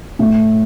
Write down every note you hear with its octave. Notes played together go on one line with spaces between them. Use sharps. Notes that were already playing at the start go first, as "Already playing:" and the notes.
A2